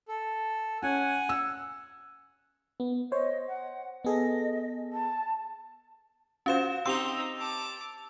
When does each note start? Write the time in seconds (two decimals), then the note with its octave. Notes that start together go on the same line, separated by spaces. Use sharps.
0.08 A4
0.82 C#4 F#5 G#5
1.29 E6
2.80 B3
3.12 C5 C#5 D#5
3.48 F#5
4.05 B3 G#4 A4 D#5
4.92 A5
6.46 C#4 F4 F#4 C5 F5 E7
6.86 C4 D#4 G4 C6 E6 F7
7.37 A5 D6